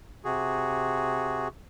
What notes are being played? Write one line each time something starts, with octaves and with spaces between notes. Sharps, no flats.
C3 F#4 G#4